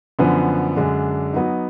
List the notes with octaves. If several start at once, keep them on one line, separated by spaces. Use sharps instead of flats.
F#2 D3 F3 B3
F#2 D3 G#3 D4
F#3 B3 D#4